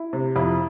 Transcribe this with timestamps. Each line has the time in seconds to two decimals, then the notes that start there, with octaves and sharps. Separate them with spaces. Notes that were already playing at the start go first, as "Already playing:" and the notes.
Already playing: E4
0.13 C3
0.36 F2 E4